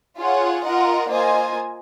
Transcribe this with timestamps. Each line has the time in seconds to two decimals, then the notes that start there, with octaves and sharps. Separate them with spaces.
0.18 F4 G#4 C#5 F#5
0.64 F4 A#4 D#5 F#5
1.09 A#3 F4 C5 D#5 G#5